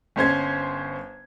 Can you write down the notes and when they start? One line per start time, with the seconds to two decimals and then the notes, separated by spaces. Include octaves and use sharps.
0.16 G1 C#4 C5 G#6